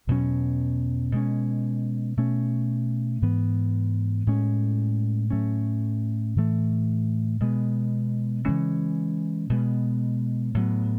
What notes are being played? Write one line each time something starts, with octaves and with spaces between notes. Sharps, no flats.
E2 B2 F#3 C#4
B2 G#3 C#4
B2 A3 C#4
G#2 E3 B3
A2 G#3 C#4
A2 F#3 A3 C#4
A2 E3 A3
B2 G#3 B3
C#3 E3 G#3 C#4
B2 G#3 B3
A2 F#3 B3